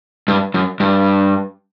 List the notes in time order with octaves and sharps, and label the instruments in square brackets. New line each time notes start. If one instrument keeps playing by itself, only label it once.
[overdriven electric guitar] G2
F#2
G2